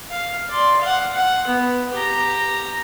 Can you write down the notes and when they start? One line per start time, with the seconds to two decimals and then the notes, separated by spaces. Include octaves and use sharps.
0.11 F5
0.49 D5 C6
0.81 F5 F#5
1.15 F#5
1.47 B3
1.93 G4 A#5